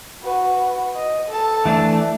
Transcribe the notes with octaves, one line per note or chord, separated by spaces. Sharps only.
F#4 B4
D#5
A4 A5
E3 A3 D4